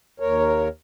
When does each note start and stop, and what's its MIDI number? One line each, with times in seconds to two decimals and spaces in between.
0.20 0.68 39
0.20 0.68 70
0.20 0.68 73